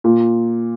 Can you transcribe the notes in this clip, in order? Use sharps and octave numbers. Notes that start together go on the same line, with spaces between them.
A#2